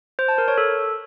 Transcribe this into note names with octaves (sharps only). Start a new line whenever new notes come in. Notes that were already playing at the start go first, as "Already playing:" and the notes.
C5
A5
A#4
C#5
A4